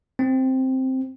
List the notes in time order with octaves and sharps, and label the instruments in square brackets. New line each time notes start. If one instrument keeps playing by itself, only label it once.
[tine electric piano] C4